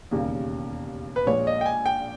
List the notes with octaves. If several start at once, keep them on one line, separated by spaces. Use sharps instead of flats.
E1 D#2 C#3 G3 A#3
B4
A#1 A#2 G#3 C#5
D#5
G5
G#5
G5